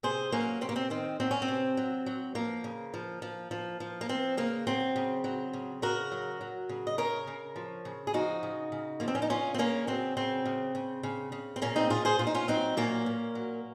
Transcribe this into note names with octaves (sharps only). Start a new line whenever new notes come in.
C3 G#4 C5
F#3 A#3 C#4
C3 C4
A#3
C4
D#3 C4
F#3 C4
C#4
C4
C3
F#3
F#3
F3 A#3
C#3
F3
F3
F3
F3
A#3
F3 C4
C#3 A#3
F#3 C4
C#3
F#3
C#3
C#3 F#4 A#4
F#3
F#3
C#3
D#5
C#3 A#4 C#5
C#3
F3
C#3
G#4
F3 D#4 F#4
C#3
C#3
F3 A#3
C4
C#4
D#4
C#3 C#4 F4
C4
C#3 A#3 C#4
F#3 C4
C#3 C4
C#3
C#3
C#3
C#3
C4
A#2 A#3 C#4
C4 D#4
A#2 F4 G#4
G#4 C5
A#2 F4
D#4
C#4 F4
F#3 C4 D#4
A#2 A#3 C#4
A#2
F#3